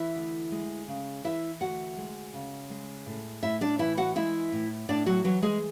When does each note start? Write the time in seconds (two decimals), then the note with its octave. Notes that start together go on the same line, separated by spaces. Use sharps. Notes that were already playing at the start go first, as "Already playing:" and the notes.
Already playing: E3 E4 E5
0.15 D2
0.52 G#3
0.88 C#3
1.24 E3 E4 E5
1.61 D2 F#4 F#5
1.97 G#3
2.33 C#3
2.70 G#3
3.06 A2
3.43 A2 E4 E5
3.61 D4 D5
3.79 E3 E4 E5
3.97 F#4 F#5
4.15 G#3 E4 E5
4.52 A2
4.89 A2 D4 D5
5.06 F#3 F#4
5.24 E3 F#3 F#4
5.42 G#3 G#4